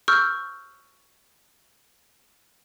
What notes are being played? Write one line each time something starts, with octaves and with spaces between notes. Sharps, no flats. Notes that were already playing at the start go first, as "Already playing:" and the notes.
C#6 E6 F6 G6